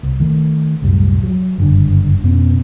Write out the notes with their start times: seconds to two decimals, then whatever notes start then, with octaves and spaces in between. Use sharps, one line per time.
0.03 C2
0.20 D#3 A3
0.82 C2 F#2 A2 G3
1.23 F#3
1.58 F#1 G2 D3
2.23 F2 B2 B3 C#4